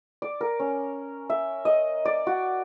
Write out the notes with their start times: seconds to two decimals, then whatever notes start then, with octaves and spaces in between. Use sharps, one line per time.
0.22 D5
0.41 A#4
0.60 C#4
1.30 E5
1.65 D#5
2.05 D5
2.27 F#4